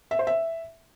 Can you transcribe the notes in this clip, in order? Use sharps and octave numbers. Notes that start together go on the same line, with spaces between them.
E5
C5
E5